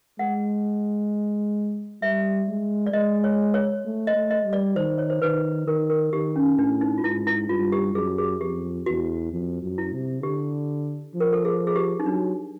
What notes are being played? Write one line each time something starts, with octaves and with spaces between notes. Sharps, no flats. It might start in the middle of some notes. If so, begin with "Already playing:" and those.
G#3 F#5
G3 E5
G#3
D5
G#3 D#5
C#5
C#5
A3
D#5
A3
D#5
G3
D5
D#3 C5
C#5
C5
D#3 B4
D#3 A#4
A#4
D#3 G4
C#4
A2 D4
D#4
F4
G#2 E4
E4
G2 F4
G4
F#2 G#4
G#4
F2 G4
E2 F#4
F2
F#2
E4
C3
D3 G4
F3
A#4
A4
G#4
G#4
G4
D#4
F#3 D4